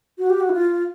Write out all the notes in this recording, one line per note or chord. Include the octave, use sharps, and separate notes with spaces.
F#4
G4
F#4
E4
F4